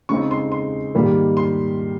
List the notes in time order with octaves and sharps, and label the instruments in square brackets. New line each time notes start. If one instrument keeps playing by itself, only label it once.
[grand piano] C#3 G#3 C4 D#4 C#6
C6
C6
G#2 D#3 G3 A#3
C6